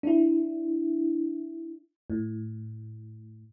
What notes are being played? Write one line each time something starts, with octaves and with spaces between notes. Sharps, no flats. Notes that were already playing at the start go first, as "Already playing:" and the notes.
D4 E4
A2